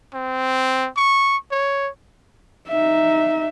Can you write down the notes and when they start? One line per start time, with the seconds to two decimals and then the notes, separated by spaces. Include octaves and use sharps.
0.14 C4
0.97 C#6
1.51 C#5
2.68 D#4 E5